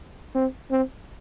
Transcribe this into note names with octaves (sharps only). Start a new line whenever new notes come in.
C4
C4